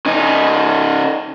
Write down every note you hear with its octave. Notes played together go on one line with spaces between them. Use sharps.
C#3 D#4